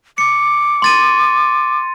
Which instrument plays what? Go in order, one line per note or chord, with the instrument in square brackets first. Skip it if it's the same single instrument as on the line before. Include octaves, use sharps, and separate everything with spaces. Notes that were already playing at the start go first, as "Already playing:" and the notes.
[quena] D6 [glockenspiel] C#7
[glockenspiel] C6 A6 D#7